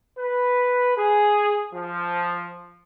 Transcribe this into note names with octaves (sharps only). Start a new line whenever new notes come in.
B4
G#4
F3